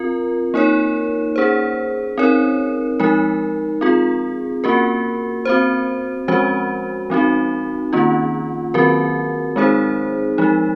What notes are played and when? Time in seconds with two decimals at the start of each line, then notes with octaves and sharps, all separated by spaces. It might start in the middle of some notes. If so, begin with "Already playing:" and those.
Already playing: C4 F4 A#4
0.54 A#3 D#4 A#4 C#5
1.36 C#4 G#4 C5
2.18 C4 D#4 A#4 C#5
3.00 F3 G#3 D#4 A#4
3.81 C4 F4 G#4
4.64 A#3 C#4 F#4 A#4
5.45 C4 F#4 C5
6.28 F3 G#3 C#4 F#4 C5
7.10 F3 C4 D#4 F#4
7.93 D#3 A#3 C#4 F4
8.74 D#3 F#3 C4 F#4 A#4
9.56 G#3 C4 D#4 G#4 C5
10.38 F3 G#3 D#4